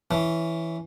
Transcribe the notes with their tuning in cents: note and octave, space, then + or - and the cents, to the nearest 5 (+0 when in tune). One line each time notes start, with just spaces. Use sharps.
E3 +0 C#4 +0